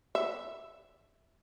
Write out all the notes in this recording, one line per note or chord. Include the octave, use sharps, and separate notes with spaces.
E5